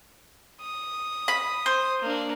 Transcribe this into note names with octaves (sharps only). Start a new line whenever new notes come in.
D#6
B5
C5
A#3 D4